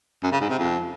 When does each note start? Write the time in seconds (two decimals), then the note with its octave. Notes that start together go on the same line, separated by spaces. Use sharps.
0.23 F#2
0.32 C#3
0.41 G#2
0.50 C3
0.58 F2